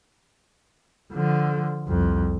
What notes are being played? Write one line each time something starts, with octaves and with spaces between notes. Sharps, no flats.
D3 F3
C2 F2